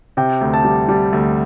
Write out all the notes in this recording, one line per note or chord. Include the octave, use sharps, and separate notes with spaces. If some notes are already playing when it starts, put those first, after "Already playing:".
C3 G5
D2
A5
G3
G3 A5
D2